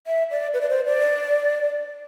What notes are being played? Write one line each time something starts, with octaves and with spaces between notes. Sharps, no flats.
E5
D5
B4
D5
C5
D5